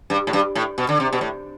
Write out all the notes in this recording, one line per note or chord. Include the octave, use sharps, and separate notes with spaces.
G2
A2
G2
A2
B2
D3
C3
B2
A2